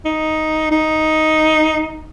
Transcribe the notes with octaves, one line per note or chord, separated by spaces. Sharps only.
D#4
D#4